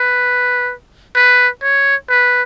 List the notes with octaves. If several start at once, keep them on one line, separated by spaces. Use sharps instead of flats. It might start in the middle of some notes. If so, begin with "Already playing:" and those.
Already playing: B4
B4
C#5
B4